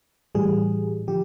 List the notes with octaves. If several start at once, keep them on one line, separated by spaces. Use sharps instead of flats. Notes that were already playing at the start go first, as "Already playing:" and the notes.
A2 E3 G3 G#4
D3 F3 G4